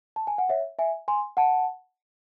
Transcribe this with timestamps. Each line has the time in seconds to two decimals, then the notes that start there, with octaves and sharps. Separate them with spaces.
0.16 A5
0.27 G#5
0.38 F#5
0.49 C#5 E5
0.79 E5 G#5
1.08 G#5 C6
1.37 F#5 A5